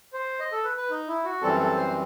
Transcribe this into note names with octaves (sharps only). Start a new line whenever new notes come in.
C5
D#5
A4
B4
B4
D#4
E4
F#4
F#2 E3 G3 C4 A4
A4
C5